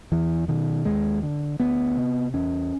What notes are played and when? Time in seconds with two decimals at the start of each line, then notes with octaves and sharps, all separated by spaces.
0.12 E2 E3
0.48 B2 D#3
0.85 D#2 G#3
1.23 D3
1.60 D2 B3
1.97 C3
2.34 E2 C#4